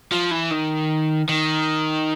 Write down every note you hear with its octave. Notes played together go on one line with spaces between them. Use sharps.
F3
E3
D#3
D#3